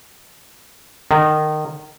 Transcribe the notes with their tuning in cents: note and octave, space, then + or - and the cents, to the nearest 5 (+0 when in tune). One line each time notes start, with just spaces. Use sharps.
D#3 -25